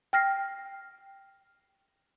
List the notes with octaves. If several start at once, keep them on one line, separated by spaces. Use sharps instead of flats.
G5 F6 A#6 C7